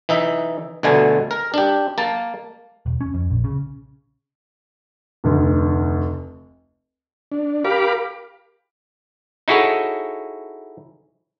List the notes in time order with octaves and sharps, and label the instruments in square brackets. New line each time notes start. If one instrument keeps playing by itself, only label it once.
[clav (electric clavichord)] E3 D#4 E5
D2 B2 D3 A3 G#5
A#4
D4 G4
A#3 A5
[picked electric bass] E1
C#4
F2
A#1
C#3
[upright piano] F1 D2
[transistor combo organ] D4
G4 A#4 F5 B5 D6
[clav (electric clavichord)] D#4 E4 F#4 G#4 A4 C#5